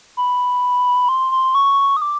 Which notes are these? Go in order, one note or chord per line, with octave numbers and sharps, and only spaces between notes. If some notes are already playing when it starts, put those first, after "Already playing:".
B5
C6
C6
C#6
D#6
D6